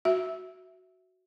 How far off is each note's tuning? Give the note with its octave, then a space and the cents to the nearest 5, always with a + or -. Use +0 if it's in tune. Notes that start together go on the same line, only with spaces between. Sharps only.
F#4 +0 E5 +0